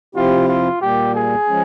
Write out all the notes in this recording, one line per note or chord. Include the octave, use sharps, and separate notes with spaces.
C3 F3 C4 E4 F4 G4
F4
A#2 G3 A#3 G4
G#4
F3 G#3 C#4